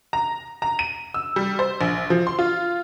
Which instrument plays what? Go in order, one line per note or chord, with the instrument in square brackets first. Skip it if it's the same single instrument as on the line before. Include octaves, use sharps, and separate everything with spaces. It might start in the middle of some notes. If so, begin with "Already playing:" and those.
[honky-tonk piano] A#5
A#5
D#7
E6
G3
C5
A#1
F3
C6
F4